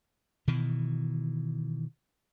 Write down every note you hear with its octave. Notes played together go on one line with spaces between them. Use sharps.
B2 D#3 E3